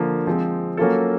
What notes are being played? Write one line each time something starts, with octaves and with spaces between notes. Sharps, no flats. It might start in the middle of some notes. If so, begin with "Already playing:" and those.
Already playing: D3 F3 A#3
F3 G#3 C4
F#3 A#3 C#4 F4 A4